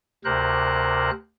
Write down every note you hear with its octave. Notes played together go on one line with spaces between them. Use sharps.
D2 C3 A#4 C5 F#6